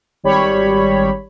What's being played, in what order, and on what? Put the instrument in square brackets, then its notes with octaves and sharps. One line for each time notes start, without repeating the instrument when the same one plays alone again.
[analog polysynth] G#1 G3 C#5 B5